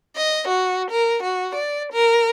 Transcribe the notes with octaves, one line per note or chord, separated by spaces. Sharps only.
D#5
F#4
A#4
F#4
D5
A#4